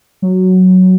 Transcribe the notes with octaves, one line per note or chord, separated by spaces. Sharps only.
F#3